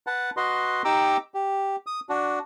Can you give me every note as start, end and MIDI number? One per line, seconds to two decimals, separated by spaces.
0.07 0.30 71
0.07 0.30 78
0.07 0.30 81
0.37 0.82 66
0.37 0.82 71
0.37 0.82 75
0.37 0.82 84
0.85 1.17 63
0.85 1.17 67
0.85 1.17 79
0.85 1.17 82
0.85 1.17 86
0.85 1.17 88
1.34 1.76 67
1.87 2.00 87
2.09 2.39 62
2.09 2.39 66